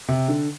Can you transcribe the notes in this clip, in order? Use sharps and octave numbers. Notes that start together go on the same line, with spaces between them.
C3
D3